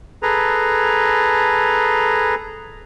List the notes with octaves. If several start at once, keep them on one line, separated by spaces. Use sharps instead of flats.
G#4 A4 B4 A#5